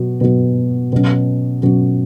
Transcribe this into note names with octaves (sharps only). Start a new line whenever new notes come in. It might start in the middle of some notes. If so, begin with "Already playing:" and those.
Already playing: B2 F#3 B3
B2 F#3 B3
B2 F#3 C#4
B2 F#3 C#4